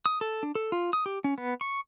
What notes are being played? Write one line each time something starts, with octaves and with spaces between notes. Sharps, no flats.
D#6
A4
D4
A4
F4
D#6
G4
C#4
B3
C#6